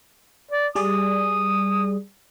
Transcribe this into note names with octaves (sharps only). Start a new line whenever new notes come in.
D5
G3 G#4 D5 D#6